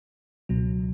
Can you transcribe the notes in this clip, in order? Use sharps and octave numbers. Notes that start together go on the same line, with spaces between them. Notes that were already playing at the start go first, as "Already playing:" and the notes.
C#2 B2 F#3